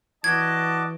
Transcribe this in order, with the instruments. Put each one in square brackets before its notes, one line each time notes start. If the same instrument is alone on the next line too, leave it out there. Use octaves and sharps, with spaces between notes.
[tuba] E3 [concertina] F#4 D5 D6 [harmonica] D#5 A5 [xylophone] G#6